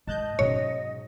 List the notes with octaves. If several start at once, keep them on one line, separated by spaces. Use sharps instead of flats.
G#2 D#5 A5 F#6 G6
G#2 B2 F#3 C#4 C#5